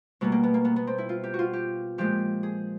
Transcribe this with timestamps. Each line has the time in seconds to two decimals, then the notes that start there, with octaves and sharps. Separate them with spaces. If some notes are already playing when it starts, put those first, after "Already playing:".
0.21 B2 G3 A#3 B3
0.32 A#3
0.43 B3
0.54 A#3
0.65 B3
0.76 B3
0.87 C4
0.98 E4
1.09 F4
1.24 G4
1.34 F#4
1.39 F4
1.53 G4
1.98 A#2 F3 G#3 G4
2.43 G#4